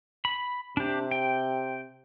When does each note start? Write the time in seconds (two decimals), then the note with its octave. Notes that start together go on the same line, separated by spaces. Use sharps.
0.25 B5
0.77 C3 D4 G4
1.11 G5